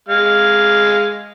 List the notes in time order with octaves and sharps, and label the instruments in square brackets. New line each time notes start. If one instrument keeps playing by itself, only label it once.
[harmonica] G#3 F5